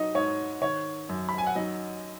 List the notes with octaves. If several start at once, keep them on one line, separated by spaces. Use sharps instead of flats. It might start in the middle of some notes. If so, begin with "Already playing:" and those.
Already playing: F#3 D#4 D#5
G#2 C#5
D#3 C#5
F#2
B5
G#5
F#5
F#3 D#4 D#5